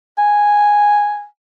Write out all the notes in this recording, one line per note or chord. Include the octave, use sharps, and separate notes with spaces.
G#5